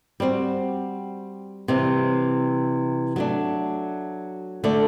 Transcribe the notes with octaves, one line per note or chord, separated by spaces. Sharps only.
G3 C4 F#4
C3 E3 G3
F#3 A3 D4
D3 A3 D4 A4